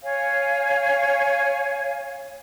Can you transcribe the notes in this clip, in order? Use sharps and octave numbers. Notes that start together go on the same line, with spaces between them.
C#5 F5 G#5